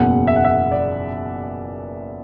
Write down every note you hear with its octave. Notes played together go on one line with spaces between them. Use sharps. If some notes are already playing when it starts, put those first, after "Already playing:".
Already playing: F#1 E2 B2 A#3 F#5
E5
F#5
E5
D5